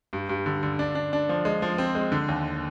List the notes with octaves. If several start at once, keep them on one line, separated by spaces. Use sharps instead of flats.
G2
G2
D3
D3
D4
D4
D4
F3
G#3
F3
C4
G#3
D3
D#2